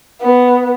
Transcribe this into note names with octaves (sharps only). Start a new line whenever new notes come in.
B3